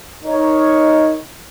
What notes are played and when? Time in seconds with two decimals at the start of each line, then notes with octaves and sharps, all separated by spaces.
0.24 D#4 A#4 C#5